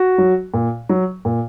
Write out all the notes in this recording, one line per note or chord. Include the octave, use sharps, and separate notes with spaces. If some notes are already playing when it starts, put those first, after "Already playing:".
Already playing: F#4
F#3
A#2
F#3
A#2